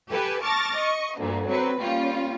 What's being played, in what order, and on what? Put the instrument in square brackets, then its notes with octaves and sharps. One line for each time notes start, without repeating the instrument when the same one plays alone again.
[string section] G4 A4 B4 G#5
A5 C#6 D6 F6 A6 A#6
D#5 C#6
D2 G2 A#2
F#3 C4 B4
G3 A#3 C#4 F4